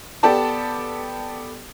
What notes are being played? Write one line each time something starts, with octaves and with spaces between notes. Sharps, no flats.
B3 G4 A4 D5 A5